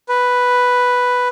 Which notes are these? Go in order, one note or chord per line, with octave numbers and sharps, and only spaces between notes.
B4